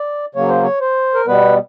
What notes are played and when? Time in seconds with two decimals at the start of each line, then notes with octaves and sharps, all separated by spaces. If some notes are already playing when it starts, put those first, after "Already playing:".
Already playing: D5
0.35 C#3 F#3 A#3 C#5
0.49 C5
0.63 C#5
0.80 C5
1.14 A#4
1.26 B2 G3 B3 B4